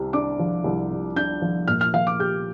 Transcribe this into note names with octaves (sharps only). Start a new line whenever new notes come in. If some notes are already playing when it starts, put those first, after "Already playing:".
Already playing: C2 C3
D4 D6
F3
C2
C3
D4 G6
F3
A#2 F6
F6
F3 F5
D6
G4 G6